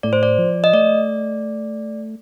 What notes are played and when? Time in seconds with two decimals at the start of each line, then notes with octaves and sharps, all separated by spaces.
0.03 A2 D5
0.13 C5
0.23 D5
0.39 F3
0.64 D#5
0.73 A3 D5